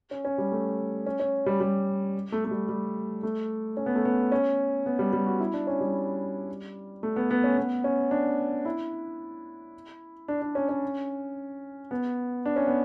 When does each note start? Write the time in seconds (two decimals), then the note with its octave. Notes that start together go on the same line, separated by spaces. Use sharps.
0.11 C#4
0.25 C#4
0.38 G3
0.52 A3
1.06 C#4
1.20 C#4
1.46 G3
1.60 G3
2.32 A3
2.45 A3
2.51 G3
2.69 G3
3.23 A3
3.77 C#4
3.86 B3
3.95 A3
4.05 B3
4.32 C#4
4.86 B3
4.99 G3
5.13 G3
5.26 F#4
5.40 E4
5.53 D4
5.67 C#4
5.80 G3
7.03 A3
7.16 B3
7.31 B3
7.44 C#4
7.57 B3
7.84 C#4
8.11 D4
8.65 E4
10.28 D4
10.42 D4
10.55 C#4
10.69 C#4
11.91 B3
12.46 D4
12.56 C#4
12.67 B3